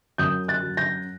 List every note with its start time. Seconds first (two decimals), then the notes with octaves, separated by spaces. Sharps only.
0.18 F#2 D#6 G6
0.48 F#6 A6
0.63 F#3
0.77 G6 A#6